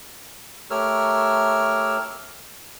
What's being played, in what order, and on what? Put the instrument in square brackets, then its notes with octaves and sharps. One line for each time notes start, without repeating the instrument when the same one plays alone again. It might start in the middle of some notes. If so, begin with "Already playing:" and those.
[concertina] A3 G4 A#4 C#5 E6 F6